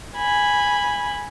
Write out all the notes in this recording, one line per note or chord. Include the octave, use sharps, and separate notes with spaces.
G#5 B5